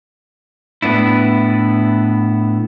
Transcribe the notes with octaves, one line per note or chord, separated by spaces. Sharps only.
A2 B3 D4 E4